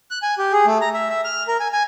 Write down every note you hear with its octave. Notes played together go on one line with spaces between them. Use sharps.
F#6
G#5
G4
G#4
A3
A#5
E5
E5
F6
A#4
G#5
G#5